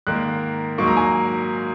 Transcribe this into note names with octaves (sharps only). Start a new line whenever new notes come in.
G#2 D#3 A#3 F#6
G#2 F#3 A#3 C#6
A#5
G#5